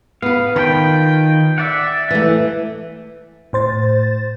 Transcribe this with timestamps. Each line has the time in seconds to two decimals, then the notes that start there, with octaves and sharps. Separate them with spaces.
0.22 B3 B4 F5
0.56 D#3 F4 B4 G5 A5
1.58 D5 E5 F#5
2.10 E3 A3
3.53 A2 C5 A6